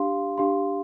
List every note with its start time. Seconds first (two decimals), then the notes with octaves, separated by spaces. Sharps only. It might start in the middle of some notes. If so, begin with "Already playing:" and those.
Already playing: D4 G4 F5 C6
0.38 D4 G4 F5 C6